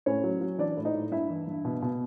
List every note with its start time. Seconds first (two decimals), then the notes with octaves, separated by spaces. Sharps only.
0.06 A2 C#4 C#5
0.24 F#3
0.41 F#3
0.58 E3 D4 D5
0.77 A2
0.85 D#4 D#5
0.95 A2
1.11 G2 E4 E5
1.30 E3
1.47 G2
1.65 B2
1.82 B2